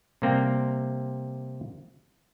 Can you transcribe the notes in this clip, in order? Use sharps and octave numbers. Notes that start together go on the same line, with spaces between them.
C3 G3 A#3 C4